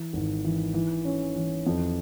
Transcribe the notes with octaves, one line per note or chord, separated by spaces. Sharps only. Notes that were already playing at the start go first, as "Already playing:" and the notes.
Already playing: E3
G#1
E3
E3
C#4
E3
F2